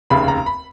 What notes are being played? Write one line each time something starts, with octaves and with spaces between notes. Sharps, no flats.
F1 D#2 C#3 B5
A#5
B5